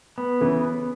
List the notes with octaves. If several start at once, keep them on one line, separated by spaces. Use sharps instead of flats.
B3
C#3 E3